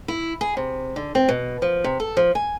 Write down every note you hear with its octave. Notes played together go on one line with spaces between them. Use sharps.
E4
G#4
C3
D3
C4
B2
F3
C3
A4
F3
G#5